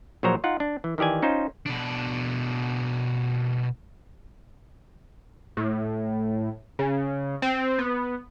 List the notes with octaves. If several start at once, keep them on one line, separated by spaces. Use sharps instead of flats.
A#1 F3 F#3 C5 C#5 A#5
D#4 F4 F#5
D4
E3
D#3 E3 G4 D5 G#5
C#4 D#4 F4 C5
B2 D4
A2
C#3
C4
B3